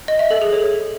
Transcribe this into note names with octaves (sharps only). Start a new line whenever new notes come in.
D#5
E5
A4
G#4
C#5